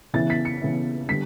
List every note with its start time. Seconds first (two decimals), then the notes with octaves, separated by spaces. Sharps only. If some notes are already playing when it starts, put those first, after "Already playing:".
0.14 C#3 E3 B3 E4 A6
0.30 B6
0.45 C#7
0.62 C#3 E3 B3 E4
1.08 D3 G3 B6